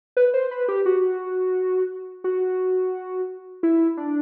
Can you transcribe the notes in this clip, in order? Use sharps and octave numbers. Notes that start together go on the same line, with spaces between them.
B4
C5
B4
G4
F#4
F#4
E4
D4